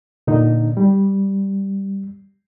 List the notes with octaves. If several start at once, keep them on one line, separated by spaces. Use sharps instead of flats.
A#2 D3 D#4
G3